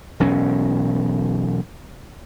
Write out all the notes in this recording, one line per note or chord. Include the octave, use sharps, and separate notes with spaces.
E1 B1 C#4